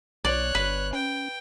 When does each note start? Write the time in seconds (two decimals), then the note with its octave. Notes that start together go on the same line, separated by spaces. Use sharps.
0.25 B1 C#5 D5 F#6
0.55 G1 B4
0.93 C#4 G5